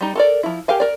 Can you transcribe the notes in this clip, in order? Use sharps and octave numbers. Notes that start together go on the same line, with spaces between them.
G3 D#4
A4 A#4 D5
F3 E4
G4 A#4 F5 G#5
A#4 D5